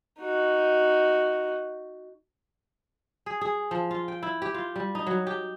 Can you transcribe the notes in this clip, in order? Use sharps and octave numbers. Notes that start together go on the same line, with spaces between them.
D#4 F#4
G#4
G#4
F3
F4
G5
E4
G4
F4
G3
D#4
F#3
G4